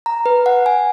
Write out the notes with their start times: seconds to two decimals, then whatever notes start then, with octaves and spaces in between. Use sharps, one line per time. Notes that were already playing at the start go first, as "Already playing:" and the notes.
0.06 A#5
0.26 B4
0.46 F#5
0.66 G#5